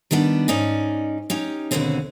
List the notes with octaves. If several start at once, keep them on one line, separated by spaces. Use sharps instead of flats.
D#3 G3 B3 D4
G#2 C#4 D#4 D5 G#5
C#4 D#4 G4
D#2 G#2 B2 D3 C4 C#4